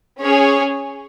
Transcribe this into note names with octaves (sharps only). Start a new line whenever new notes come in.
C#4 G#4 C#5